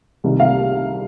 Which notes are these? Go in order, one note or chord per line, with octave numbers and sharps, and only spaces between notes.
C2 C3 D#3
F5